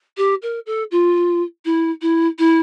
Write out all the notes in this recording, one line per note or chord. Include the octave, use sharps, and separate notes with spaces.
G4
A#4
A4
F4
E4
E4
E4